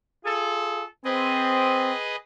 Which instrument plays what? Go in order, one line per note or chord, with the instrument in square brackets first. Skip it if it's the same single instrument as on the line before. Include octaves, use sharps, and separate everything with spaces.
[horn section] F4 G#4 A4
[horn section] C4 [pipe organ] G#4 B4 D#5